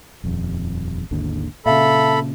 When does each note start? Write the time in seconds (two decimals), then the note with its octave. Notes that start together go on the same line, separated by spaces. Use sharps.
0.24 D#1 F2
1.11 G#1 D#2 D3
1.66 A#2 C#3 A4 E5 F5 A5 B5